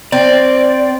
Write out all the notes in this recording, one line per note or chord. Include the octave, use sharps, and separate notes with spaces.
C4 D5